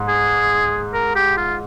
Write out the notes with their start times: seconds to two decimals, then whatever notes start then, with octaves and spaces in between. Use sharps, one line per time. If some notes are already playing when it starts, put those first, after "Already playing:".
Already playing: G#2
0.08 G#4
0.94 A#4
1.15 G4
1.38 F4